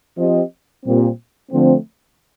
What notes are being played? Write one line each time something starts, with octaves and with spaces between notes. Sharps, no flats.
F3 C4 G4 C5 D#5
A#2 G3 C4
D3 F3 A3 C4